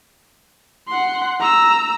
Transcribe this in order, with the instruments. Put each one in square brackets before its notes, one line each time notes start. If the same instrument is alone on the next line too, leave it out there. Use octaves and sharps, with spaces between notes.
[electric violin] F#5 C6
A#5 E6